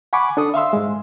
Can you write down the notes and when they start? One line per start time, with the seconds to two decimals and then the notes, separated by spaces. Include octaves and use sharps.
0.13 F#5 G#5 B5 C#6 D6
0.37 D4 A4 D#6
0.54 E5 F5 C6 E6
0.73 G#2 G#3